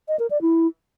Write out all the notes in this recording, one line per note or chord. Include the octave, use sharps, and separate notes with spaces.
D#5
A#4
D5
E4